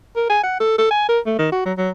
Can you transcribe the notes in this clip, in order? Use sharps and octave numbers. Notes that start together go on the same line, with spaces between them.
A#4
G#5
F#5
A4
A4
G#5
A#4
A3
D#3
F#4
F#3
F#3